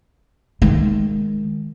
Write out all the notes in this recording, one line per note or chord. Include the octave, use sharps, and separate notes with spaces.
D#3 G#3